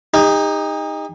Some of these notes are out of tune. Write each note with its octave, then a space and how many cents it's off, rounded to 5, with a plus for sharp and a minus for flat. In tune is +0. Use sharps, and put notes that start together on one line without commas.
D#4 +0 G4 +45